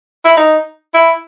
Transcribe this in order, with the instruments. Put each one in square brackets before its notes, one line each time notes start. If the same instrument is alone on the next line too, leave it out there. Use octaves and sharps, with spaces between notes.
[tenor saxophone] E4
D#4
E4